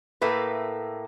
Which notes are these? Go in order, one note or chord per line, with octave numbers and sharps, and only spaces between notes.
A2 A3 A#3 B4